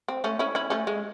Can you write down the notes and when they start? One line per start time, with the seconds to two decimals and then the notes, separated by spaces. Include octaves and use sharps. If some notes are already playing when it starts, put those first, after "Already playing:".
0.08 C4
0.24 A3 C#4
0.39 C#4 E4
0.55 C#4 E4
0.70 A3 C#4
0.87 G#3